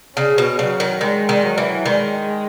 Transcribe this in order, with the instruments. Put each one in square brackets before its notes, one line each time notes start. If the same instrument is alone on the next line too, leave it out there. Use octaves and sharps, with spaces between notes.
[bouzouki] C#3 [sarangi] C#4
[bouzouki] B2
[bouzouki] C#3 [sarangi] F#3
[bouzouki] D#3
[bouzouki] D#3 [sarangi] G#3
[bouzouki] D#3
[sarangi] F#3
[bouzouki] E3
[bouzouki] D#3 [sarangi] G#3